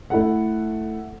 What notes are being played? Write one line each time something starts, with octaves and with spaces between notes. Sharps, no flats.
A3 E4 A4 F#5